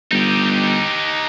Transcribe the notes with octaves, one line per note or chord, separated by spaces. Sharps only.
G1 D#4 G4